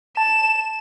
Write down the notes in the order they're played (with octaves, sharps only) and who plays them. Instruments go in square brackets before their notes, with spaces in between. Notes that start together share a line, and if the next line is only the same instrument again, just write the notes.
[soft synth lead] A5 [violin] E7